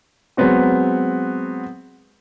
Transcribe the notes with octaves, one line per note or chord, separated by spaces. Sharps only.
F#3 G#3 B3 C4 F#4